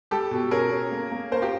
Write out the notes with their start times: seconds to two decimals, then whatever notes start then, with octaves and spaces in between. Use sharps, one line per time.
0.11 G3 G4 A4
0.31 B2
0.51 C#4 G#4 A#4
0.72 C#4
0.92 A#3
1.12 A#3
1.31 C#4 A#4 C5
1.42 F4 G4